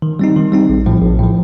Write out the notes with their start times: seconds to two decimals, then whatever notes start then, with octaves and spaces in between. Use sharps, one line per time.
0.02 D#3
0.19 G3 C4 D#4
0.36 D#3
0.52 G3 C4 D#4
0.69 A#1
0.86 A2 F3
1.02 A#1
1.19 A2 F3